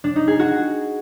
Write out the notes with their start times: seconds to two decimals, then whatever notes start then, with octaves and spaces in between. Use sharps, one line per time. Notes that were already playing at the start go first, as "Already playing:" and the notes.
0.04 D4
0.16 D#4
0.28 G#4
0.39 F#4